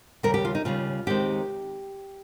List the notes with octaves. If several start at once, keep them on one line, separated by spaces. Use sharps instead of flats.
D#2 C#3 G3 A#4
G4
F4
D#4
D#2 C#3 G3 F4
D#2 D#3 G#3 C4 G4